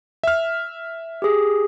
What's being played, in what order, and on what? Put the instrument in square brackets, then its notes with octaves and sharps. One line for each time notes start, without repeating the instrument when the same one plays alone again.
[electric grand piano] E5 F6
[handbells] G4 G#4